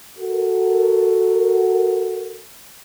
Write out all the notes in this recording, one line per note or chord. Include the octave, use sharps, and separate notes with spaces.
F#4 A4 A#4